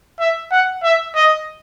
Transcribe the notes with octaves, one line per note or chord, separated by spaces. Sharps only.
E5
F#5
E5
D#5